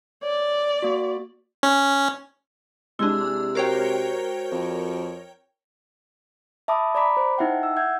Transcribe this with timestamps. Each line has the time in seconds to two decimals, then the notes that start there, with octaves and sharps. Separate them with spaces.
0.23 C#5 D5
0.82 A#3 F#4
1.63 C#4
2.99 C3 G#3 D4 E4 G#4
3.55 F#4 A#4 C5 C#5 G5
4.52 F2
6.68 E5 A5 B5 D6 D#6
6.95 D5 A#5 B5 D6 B6
7.17 C5
7.38 D#4 E4 E5 F#5 G5
7.63 E6
7.77 E5 F#5 G6 G#6